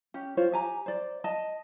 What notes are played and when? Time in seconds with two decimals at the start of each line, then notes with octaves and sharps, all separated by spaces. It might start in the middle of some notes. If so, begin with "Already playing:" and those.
0.14 C#4 G4
0.37 F4 C5 C#5
0.52 G4 G#5 A#5
0.86 C5 D5
1.24 D#5 A5